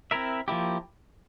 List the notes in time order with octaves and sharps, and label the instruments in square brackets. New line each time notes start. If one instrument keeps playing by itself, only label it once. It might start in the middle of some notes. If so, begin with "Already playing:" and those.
[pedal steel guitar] C4 E4 A#4 E5
F3 A#3 E4 G4